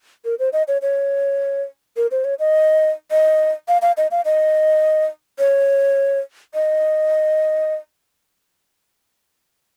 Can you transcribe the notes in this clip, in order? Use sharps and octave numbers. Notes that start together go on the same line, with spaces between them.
A#4
C5
D#5
C#5
C#5
A#4
C5
C#5
D#5
D#5
F5
F5
D#5
F5
D#5
C#5
D#5